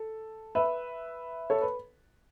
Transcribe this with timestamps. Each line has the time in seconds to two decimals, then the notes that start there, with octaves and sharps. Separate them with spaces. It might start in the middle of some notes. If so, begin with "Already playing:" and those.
Already playing: A4
0.55 B4 E5
1.50 A4 C#5
1.61 B4